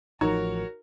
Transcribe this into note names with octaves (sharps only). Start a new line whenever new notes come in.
A1 F3 D#4 F#4 A#4 C#5